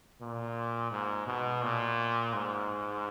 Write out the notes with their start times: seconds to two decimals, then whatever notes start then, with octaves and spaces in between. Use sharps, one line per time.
0.21 A#2
0.92 G#2
1.27 B2
1.62 A#2
2.33 G#2